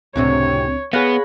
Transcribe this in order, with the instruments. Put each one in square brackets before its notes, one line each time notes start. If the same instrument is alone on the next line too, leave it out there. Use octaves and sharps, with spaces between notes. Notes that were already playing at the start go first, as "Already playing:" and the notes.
[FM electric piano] C#2 C4 D4 [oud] F#2 A2 C3 [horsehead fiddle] C#5
[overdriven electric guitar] B3 [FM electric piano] G#4 F#6 A#6 [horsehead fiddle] C#5 B5 [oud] F5